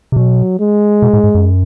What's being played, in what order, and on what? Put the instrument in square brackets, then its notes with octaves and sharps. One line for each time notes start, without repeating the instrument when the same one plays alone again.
[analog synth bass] C3
[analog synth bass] B2 [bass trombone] F#3
[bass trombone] G#3
[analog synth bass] B2
A2
G#2
F#2